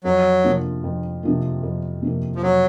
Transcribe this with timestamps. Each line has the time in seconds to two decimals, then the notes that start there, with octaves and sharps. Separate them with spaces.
0.04 F2 F#3
0.44 C3 F3 A#3
0.84 F2
1.23 C3 F3 A#3
1.63 F2
2.02 C3 F3 A#3
2.36 F3
2.42 F2 F#3